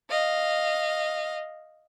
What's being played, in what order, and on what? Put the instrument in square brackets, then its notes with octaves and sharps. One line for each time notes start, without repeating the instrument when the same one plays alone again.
[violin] D#5 F5